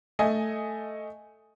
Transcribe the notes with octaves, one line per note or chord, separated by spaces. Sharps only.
A3 D#5 G#5